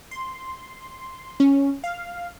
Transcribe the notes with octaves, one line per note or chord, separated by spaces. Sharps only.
C6
C#4
F5